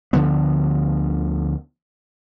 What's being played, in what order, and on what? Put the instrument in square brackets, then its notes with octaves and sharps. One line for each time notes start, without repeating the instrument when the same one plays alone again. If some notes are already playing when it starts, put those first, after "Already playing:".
[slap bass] D2 D3 F3 B3